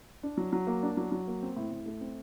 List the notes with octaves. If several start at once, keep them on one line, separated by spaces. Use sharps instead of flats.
D4
F#3
F#3
A#3
D4
F#3
F#3
A#3
C4
A2
A2
A3
C4